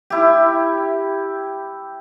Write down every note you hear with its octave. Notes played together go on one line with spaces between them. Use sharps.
E4 G4